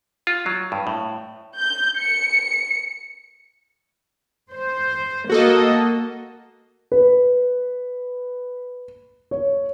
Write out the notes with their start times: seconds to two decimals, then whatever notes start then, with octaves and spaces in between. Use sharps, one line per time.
0.27 F4
0.46 F#3
0.72 G2
0.87 A2
1.57 G6
2.00 C#7
4.52 C5
5.29 A#3 F#4 A4 D#5
6.92 B4
9.31 C#5